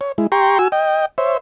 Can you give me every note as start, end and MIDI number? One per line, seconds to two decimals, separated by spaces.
0.01 0.12 73
0.18 0.27 56
0.18 0.27 64
0.32 0.58 67
0.32 0.58 79
0.32 0.58 82
0.32 0.58 84
0.32 0.58 85
0.59 0.68 66
0.59 0.68 80
0.59 0.68 88
0.72 1.05 75
0.72 1.05 79
1.18 1.37 72
1.18 1.37 73
1.18 1.37 76